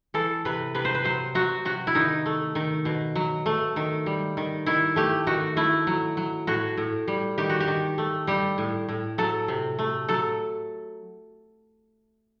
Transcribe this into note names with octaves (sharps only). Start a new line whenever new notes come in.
E3 A4
C3 B4
C3 B4
C5
B4
F#3 C5
F#3 F#4
C3 F#4
E4
D#3 D#4
A3
D#3
B2
F#3
A3
D#3
G3
D#3
D#3 E4
A3 G4
D#3 F#4
A3 E4
F#3
F#3
A2 F#4
A2
G3
D#3 G4
F#4
G4
D#3
A3
G3 G4
A2
A2
F#3 A4
C3
A3
F#3 A4